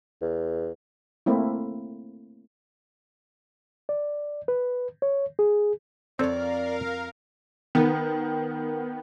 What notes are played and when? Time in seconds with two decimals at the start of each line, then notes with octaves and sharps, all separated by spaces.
0.22 E2
1.26 A3 A#3 C4 E4
3.89 D5
4.48 B4
5.02 C#5
5.39 G#4
6.19 F2 C4 A4 A#4 C#5 D5 F5
7.75 D#3 B3